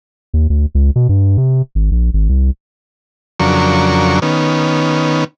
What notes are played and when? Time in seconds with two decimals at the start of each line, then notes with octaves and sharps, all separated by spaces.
0.34 D#2
0.50 D2
0.75 C#2
0.96 B2
1.09 G2
1.37 C3
1.75 G#1
1.91 A#1
2.14 G#1
2.29 C2
3.40 F2 C#3 F#3 D4 A#4 C#6
4.22 D#3 B3 C#4